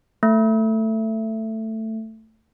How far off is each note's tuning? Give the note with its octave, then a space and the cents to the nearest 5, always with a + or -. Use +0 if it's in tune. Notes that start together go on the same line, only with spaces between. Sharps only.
A3 +10